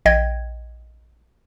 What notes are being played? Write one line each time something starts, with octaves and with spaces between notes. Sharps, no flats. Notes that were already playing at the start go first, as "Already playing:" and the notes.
A#1 D#5 G5 G#6